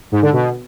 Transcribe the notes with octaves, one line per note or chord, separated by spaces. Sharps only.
G#2
D3
B2